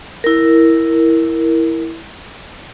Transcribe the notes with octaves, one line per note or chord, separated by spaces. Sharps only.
E4 A#4